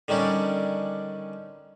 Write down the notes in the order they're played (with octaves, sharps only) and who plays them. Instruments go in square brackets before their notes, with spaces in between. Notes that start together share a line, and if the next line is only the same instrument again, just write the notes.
[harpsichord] D3 D#3 G3 C#4 D4